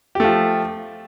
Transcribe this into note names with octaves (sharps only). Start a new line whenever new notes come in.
F3 A3 G4